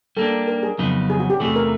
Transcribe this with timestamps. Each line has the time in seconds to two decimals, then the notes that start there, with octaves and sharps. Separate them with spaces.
0.17 G3 A#3 D4 A4
0.48 A#4
0.63 G#4
0.78 F2 C#3 F#3 B3 D#4
1.10 G#4
1.20 F#4
1.30 G4
1.40 E2 C3 E3 A3 G#4
1.56 A#4